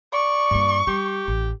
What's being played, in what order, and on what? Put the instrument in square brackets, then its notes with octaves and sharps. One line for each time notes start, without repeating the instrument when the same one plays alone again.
[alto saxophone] D5 [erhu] C#6
[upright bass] G2 A#3
[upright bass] G3 [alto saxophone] G4
[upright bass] A1